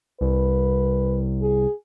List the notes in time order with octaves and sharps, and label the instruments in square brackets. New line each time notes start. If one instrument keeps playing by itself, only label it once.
[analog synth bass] C2 [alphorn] B4
[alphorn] G#4